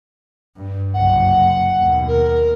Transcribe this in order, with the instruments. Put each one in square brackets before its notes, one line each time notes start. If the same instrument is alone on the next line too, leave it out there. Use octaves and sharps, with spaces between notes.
[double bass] G2
[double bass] F#1 C2 [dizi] F#5
[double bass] D#2 B2
[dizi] A#4